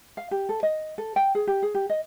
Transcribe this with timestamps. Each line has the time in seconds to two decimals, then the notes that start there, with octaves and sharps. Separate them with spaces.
0.17 F5
0.31 G4
0.49 A4
0.63 D#5
0.98 A4
1.16 G5
1.35 G#4
1.47 G4
1.62 G#4
1.75 G4
1.89 D#5